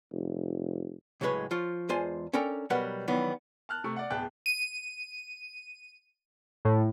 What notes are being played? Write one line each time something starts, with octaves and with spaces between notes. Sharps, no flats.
F1
C#2 A2 F#3 G#3 B4 C#5
F3 F4 C#5
E2 G#3 F4 C5 G#5 A5
C#4 D4 A4 A#4 G5 A#5
B2 F#3 G3 A#4 B4 F#5
D#3 E3 F#3 G3 B3
A5 F6 F#6
C3 A3 C#6
D5 F#5
D1 B3 G#4 G5 A5 F#6
D#7
A2